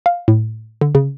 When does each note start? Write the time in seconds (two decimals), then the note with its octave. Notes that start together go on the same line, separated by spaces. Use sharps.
0.06 F5
0.28 A2
0.81 D3
0.95 C#3